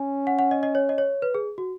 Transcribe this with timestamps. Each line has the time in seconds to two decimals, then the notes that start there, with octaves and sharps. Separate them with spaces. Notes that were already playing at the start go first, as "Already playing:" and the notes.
Already playing: C#4 G#5
0.27 F#5
0.39 F#5
0.51 D#5
0.63 D#5
0.75 C#5
0.89 D#5
0.98 C#5
1.22 B4
1.35 G#4
1.58 F#4